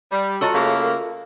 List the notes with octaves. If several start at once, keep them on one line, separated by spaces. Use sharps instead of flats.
G3
F4 F#4 A4 C#5 D#5 A#5
C#3 A3 A#3 G#4 F5 C#6
A#4 F5 E6